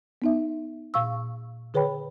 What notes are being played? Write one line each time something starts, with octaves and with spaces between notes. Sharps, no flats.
B3 D#4 E5
A#2 F5 C#6 E6
D3 G#4 B4 C#5 G5 B5